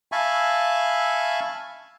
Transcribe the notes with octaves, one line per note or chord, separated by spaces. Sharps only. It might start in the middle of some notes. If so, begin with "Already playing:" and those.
E5 F5 G#5 A5 B5 C#6